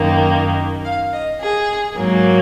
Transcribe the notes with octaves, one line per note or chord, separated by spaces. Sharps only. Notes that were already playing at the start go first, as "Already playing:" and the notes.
Already playing: F#2 D#3 A#3
F5
D#5
G#4
G#2 F#3 A#3